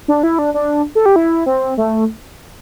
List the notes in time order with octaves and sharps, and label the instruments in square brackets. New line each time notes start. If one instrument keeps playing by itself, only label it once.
[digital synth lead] D4
E4
D4
D4
A4
G4
E4
C4
A3